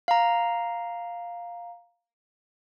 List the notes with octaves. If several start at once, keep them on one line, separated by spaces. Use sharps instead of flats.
F5 A#5